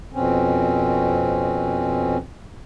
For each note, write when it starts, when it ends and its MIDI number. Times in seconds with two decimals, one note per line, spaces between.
0.14 2.17 41
0.14 2.17 47
0.14 2.17 60
0.14 2.17 61